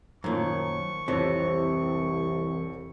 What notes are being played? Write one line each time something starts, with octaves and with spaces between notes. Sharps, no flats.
F#2 A#2 D#3 F3 C#6
C2 F2 C3 E3 C#5